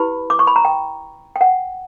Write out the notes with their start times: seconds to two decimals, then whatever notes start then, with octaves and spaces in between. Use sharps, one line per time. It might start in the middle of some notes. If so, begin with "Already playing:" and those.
Already playing: E4 G4 B4 B5
0.30 D6
0.39 C#6
0.47 B5
0.56 A#5
0.65 G5
1.36 G5
1.41 F#5